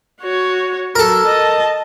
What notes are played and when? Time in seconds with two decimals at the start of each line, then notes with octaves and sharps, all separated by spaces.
0.21 F#4 C#5
0.95 F#3 A4 A#4
1.26 D#5 A5